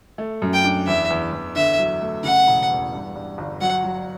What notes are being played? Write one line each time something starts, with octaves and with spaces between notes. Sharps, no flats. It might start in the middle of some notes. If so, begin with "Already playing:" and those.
A3
F#2
G5
D4
E2 E5
E2
E2
D3 E5
F#3
A3
C#3 F#5
E1
E2
G2
G2
G1
F#3 F#5
F#3